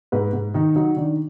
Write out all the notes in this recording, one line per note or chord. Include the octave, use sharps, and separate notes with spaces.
G#2 B4
G#2
D#3 D#4
F#3 D#4
D#3 D4